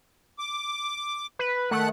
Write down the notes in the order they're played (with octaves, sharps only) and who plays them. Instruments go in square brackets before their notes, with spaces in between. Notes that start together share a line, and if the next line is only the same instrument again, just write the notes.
[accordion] D6
[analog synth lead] B4
[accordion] D#3 F#5 F#6 [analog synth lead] A3